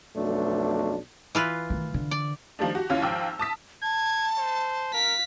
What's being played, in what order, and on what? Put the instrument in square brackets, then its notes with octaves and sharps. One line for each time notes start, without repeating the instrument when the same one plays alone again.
[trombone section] B1 F2 B2 A3 D4
[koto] E3 F4 B4
[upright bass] D#3 A3
D3
[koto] D5
[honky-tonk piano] D#3 F3 G3 A3 D4
F#4 G4
D#2 C#4 E4 F4 C#5 F6
G#1 F3 G5 E6
A5 D#6 B6
[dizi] A5 [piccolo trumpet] G#6
[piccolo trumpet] C5
[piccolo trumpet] A#4 [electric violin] F5 B6